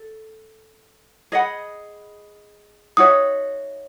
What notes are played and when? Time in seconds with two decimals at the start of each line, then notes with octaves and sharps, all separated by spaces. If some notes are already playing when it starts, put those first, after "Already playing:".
Already playing: A4
1.32 G#4 D#5 F#5 B5
2.97 D#4 F#4 C#5 E5 D#6